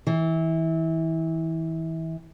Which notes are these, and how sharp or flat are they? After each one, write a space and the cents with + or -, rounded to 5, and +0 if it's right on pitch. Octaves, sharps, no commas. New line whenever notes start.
E3 -25